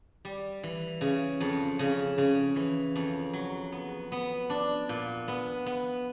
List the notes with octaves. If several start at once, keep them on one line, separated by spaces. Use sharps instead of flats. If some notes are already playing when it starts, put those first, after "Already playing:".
G3
E3
C#3
F2
C#3
C#3
E3
F2
F#3
B3
B3
D4
A#2
B3
B3